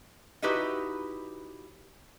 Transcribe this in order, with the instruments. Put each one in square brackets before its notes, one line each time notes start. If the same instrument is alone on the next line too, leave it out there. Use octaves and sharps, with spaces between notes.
[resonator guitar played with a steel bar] D#4 E4 F#4 G4 B4